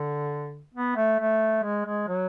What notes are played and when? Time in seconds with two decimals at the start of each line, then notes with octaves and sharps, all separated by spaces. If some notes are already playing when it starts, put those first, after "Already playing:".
Already playing: D3
0.74 B3
0.96 A3
1.19 A3
1.63 G#3
1.86 G#3
2.08 F#3